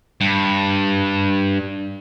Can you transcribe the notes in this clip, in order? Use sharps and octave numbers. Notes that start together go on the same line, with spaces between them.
G2